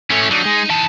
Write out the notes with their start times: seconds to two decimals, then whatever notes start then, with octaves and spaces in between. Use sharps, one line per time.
0.10 A3 C#4 E4 C#5
0.31 F#3 D4 D#4
0.45 G#3
0.70 E3 D#4 A5